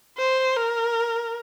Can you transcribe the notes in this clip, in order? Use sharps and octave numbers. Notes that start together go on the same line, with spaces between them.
C5
A#4